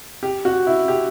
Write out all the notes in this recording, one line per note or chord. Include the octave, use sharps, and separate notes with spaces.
G4
F#4
E4
G4